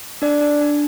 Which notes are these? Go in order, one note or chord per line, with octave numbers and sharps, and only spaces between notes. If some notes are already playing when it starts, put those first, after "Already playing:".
D4 D5
D4
D4